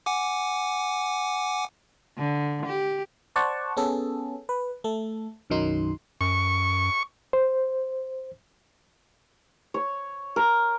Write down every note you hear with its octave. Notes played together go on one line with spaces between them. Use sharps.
F#5 G#5 D6
D3
G4
C5 D5 F#5 A5 C#6
B3 C#4 G#4 A4
B4
A3 A4
B1 F#2 D#3 F#3 D#4 C6
F#2 C#6
C5
C#5
A#4